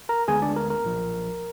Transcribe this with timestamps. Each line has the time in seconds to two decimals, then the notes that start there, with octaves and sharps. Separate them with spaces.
0.09 A#4 A#5
0.28 D2 D3 G#3 B3 G#4 G#5
0.42 D4 D5
0.56 A#4
0.70 A#4
0.84 B1 A#2 F3